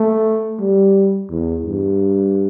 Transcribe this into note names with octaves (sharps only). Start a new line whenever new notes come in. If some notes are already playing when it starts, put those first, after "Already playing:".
Already playing: A3
G3
E2
G2